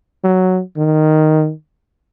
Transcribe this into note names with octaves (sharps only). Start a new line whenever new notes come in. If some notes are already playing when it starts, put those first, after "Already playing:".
F#3
D#3